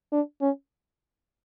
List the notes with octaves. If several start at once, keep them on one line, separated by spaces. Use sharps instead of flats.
D4
C#4